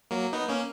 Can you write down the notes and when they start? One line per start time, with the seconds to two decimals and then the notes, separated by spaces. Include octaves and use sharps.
0.11 F#3 A#3
0.33 B3 D#4
0.49 A#3 C#4